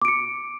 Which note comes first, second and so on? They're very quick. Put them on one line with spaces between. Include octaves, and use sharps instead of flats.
D6 D7 C#7